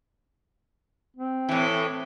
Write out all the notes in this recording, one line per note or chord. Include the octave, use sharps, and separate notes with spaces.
C4
A2 E3